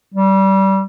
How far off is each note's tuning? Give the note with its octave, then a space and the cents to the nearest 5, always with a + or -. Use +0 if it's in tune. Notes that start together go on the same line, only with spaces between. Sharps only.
G3 -20